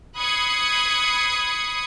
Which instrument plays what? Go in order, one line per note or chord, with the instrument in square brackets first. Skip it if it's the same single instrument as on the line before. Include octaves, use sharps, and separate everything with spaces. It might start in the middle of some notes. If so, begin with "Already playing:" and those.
[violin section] B5 D#6 F#6 G#6 C7 C#7